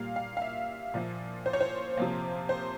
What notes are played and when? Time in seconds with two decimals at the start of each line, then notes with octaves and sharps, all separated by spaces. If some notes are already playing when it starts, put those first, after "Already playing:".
Already playing: A#2 G3 A#3 F5
0.16 F5
0.37 F5
0.42 E5
0.94 A#2 F3 A#3
1.46 C5
1.53 C#5
1.61 C5
1.97 C3 F3 A#3
2.49 C5